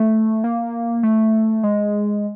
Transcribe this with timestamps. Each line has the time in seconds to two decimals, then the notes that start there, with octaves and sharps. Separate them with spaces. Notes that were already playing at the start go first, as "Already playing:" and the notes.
Already playing: A3
0.44 A#3
1.03 A3
1.63 G#3